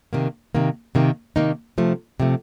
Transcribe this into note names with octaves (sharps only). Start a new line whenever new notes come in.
C3 D#3 A#3
C3 D#3 A#3
C3 D#3 A#3 D#4
C3 D#3 A#3 D#4
C3 F3 A3
C3 F3 A3